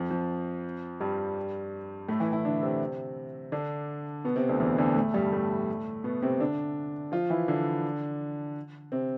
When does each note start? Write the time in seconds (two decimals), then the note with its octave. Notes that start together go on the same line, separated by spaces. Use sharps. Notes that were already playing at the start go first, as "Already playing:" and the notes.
Already playing: F2 F3
0.10 F2 F3
1.00 G2 G3
2.08 A2 A3
2.20 E3 E4
2.32 E3 E4
2.45 D3 D4
2.63 C3 C4
3.52 D3 D4
4.24 B2 B3
4.36 C3 C4
4.49 D2 D3
4.60 E2 E3
4.78 D2 D3
4.96 A2 A3
5.14 G2 G3
5.32 A2 A3
6.04 B2 B3
6.22 C3 C4
6.40 D3 D4
7.12 F3 F4
7.30 E3 E4
7.48 D3 D4
8.92 C3 C4